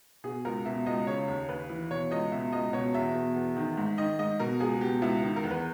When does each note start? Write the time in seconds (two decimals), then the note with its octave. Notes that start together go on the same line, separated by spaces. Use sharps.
0.24 B2 G#4
0.45 C#2 A#4
0.65 B2 E5
0.86 C#2 D#5
1.07 C#3 C#5
1.28 D#2
1.49 D#2 B4
1.70 E3
1.90 B2 C#5
2.11 C#2 D#5
2.32 B2 E5
2.52 C#2 D#5
2.73 B2 C#5
2.94 E2 E5
3.15 B2
3.36 E2
3.57 D#3
3.77 G#2
3.98 D#3 D#5
4.19 G#2 D#5
4.40 B2 A#4
4.60 C#2 G#4
4.81 B2 G4
5.02 C#2 E4
5.23 D#3
5.36 A#4
5.44 E2
5.51 B4